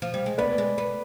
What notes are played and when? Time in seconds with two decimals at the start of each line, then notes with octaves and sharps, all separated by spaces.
0.02 F3
0.14 G3
0.26 G#3
0.38 B3 B4 D5
0.58 G#3
0.78 B3